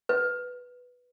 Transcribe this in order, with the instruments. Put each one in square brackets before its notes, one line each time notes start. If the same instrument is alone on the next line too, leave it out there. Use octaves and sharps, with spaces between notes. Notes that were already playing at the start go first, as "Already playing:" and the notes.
[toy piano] B4